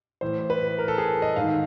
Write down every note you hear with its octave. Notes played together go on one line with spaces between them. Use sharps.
A2 E3 C5
B4
A#4
A4
G#4
D#5
G#2 D#3 F5